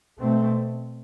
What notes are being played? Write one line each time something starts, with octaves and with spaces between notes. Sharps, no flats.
B2 A3 C4